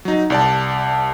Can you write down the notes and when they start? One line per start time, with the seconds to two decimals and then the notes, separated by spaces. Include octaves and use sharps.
0.05 F#3 D#4
0.30 C2 D5 A5